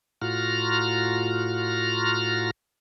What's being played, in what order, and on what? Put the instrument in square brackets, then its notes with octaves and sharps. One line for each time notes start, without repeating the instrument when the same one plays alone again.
[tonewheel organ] A2 F4 F#4 A#5 F6